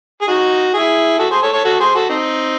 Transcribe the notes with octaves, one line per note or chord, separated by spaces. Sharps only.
G#4
D#4 F#4
E4 G#4
F#4 A4
G#4 C5
A4 C#5
A4 C#5
F#4 A4
G#4 C5
F#4 A4
C4 D#4